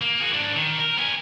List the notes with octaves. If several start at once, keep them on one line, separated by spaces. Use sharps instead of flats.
A#3
F#4 G#4
G#2 D4
D#3
A#4
B3 G#5